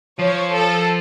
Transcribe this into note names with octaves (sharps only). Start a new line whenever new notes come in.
F3 C#5
A4